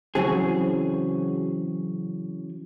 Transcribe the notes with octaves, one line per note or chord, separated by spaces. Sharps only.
C#3 E3 F#3 C4 G#4